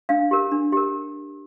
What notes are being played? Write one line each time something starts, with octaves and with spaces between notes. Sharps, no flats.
D4 F5
G4 A#4
D4
G4 A#4